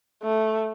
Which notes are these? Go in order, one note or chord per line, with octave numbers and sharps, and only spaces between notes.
A3